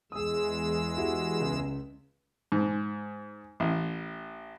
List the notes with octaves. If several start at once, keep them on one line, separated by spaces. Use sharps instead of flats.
E2 G#3 G#4 D#6 E6
E4 F#4 G4
C#2
G#2
A1